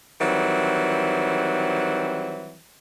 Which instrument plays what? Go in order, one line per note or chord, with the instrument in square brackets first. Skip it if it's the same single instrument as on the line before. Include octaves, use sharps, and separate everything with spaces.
[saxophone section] D#3 E3 F#3 G3 C4